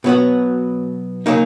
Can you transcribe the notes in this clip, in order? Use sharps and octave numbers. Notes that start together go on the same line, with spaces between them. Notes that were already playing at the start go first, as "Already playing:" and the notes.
B2 F#3 B3 F#4
C#3 F#3 A#3 D#4